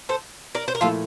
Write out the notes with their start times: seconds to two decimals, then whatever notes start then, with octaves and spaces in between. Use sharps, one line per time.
0.09 A4 C5
0.55 A#4 D5
0.68 C5
0.75 A#4
0.81 A#2 F3 A3 E4 F4 A4